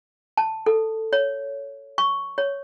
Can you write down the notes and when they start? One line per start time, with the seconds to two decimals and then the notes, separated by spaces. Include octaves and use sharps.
0.37 A5
0.66 A4
1.13 C#5
1.98 C#6
2.38 C#5